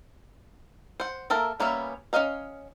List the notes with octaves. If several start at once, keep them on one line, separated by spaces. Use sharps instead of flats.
C5 F#5
A#3 A4 A#4 E5
G3 A#3 B3 C#4 E5
C#4 G#4 D#5 F5 A#5